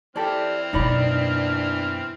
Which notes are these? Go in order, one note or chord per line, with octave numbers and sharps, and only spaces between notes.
E3 C4 G4 A4 D5 F6
F#2 B2 A#3 B3 D4 D#4 D5 B5